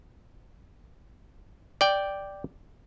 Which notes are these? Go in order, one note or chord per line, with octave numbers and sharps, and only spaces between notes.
D5 G5